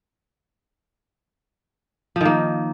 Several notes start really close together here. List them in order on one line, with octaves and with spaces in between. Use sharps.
F3 D#3 A#3